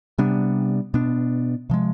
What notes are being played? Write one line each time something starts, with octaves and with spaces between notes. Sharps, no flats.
C3 G3 B3 D4
B2 B3 D4
C3 F3 G#3